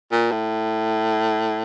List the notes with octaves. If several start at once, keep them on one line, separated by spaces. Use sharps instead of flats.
A#2
A2